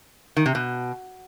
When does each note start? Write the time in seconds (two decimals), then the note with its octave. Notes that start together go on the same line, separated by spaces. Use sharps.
0.37 D#3
0.46 C3
0.55 B2